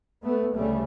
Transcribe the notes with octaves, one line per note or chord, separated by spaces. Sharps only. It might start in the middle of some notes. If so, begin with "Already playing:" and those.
A3 B3
D2 C#3 G3 A3